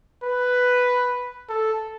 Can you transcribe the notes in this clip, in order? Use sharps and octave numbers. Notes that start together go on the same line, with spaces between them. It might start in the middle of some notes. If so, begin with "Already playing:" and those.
B4
A4